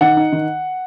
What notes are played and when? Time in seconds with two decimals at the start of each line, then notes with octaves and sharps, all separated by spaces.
0.01 D#3 F#5
0.17 D#4
0.32 D#3